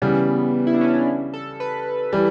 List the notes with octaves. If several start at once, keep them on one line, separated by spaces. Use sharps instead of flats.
C#3 E3 G3 B3
E4
D4
C#4
D4
A4
B4
E3 G3